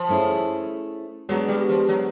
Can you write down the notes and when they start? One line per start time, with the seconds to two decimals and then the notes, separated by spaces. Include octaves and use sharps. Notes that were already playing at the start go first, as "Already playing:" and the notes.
Already playing: F3
0.09 A3 C#4 E4 G#4
1.29 F#3 G#3 B3 D4 F#4
1.48 G3
1.69 F3
1.89 F#3